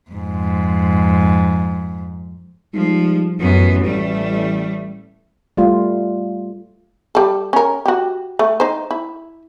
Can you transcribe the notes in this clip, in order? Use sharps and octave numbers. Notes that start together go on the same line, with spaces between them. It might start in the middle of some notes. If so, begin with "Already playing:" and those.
F2 G#2
F3 G3 G#3 D#4
A1 F#2 B3
G3 A3
G3 A3 F4
G3 A4
C#4 A#4
F#4 G4
A3
D#4 C5
E4